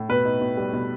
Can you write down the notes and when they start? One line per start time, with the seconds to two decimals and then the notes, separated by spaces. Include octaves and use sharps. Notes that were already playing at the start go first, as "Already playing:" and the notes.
Already playing: A2
0.09 B2 B4
0.25 D#4
0.41 B2
0.57 G3
0.73 B2